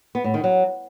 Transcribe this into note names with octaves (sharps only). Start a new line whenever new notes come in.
B3
A2
D#3
F#3